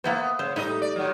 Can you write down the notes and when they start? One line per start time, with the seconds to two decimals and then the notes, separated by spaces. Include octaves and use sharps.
0.04 A#3 B3 E4 C5
0.39 C#3 C5
0.56 A2 G3 D#4 B4 D#5
0.82 D5
0.96 A#2 D#3 F#3